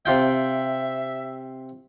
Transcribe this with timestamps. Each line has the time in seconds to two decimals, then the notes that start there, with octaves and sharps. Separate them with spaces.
0.06 C3 F4 E5 G5